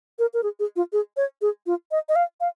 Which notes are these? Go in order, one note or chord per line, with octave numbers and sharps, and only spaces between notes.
A#4
A#4
G#4
G#4
F4
G#4
C#5
G#4
F4
D#5
D#5
F5
F5